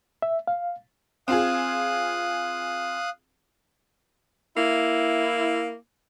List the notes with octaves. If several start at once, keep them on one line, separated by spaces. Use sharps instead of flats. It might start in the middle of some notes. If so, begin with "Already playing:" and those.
E5
F5
C4 F4 G#4 F5 D#6 F#6
A#3 E4